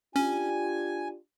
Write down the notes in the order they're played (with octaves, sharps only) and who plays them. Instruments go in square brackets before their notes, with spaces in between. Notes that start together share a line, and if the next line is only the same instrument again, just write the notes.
[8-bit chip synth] C#4 [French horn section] D4 F4 G4 [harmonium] G#5